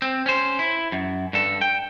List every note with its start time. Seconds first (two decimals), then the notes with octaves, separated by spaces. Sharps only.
0.02 C4
0.26 C#4 C5
0.59 E4
0.92 F#2
1.33 G2 A4
1.61 G5